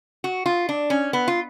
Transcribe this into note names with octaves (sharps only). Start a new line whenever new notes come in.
F#4
F4
D4
C#4
B3
F4